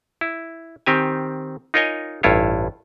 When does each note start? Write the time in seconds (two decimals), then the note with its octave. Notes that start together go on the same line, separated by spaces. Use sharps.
0.21 E4
0.86 D#3 C4 G4 G#5
1.74 D#4 F4 A#4 C#5 D#5 G#5
2.23 A1 G2 E4 F4 C#5